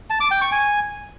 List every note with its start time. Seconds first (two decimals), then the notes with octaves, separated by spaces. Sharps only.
0.10 A5
0.21 D6
0.31 G5
0.41 C#6
0.52 G#5